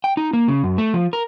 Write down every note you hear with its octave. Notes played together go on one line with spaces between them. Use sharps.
G5
D#4
A#3
C#3
F#2
A3
F3
A#4